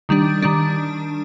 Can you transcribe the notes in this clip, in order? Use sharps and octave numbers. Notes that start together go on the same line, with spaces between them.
D#3 G3 D4
D#3 G3 D4